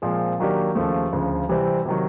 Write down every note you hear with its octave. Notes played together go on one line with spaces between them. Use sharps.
A#2 F3 G#3 C4
D#3 F#3 A#3 D4 G4
D#2 C#3 F3 A3
D2 C#3 F3
C3 E3 G3 C4
C3 D#3 F#3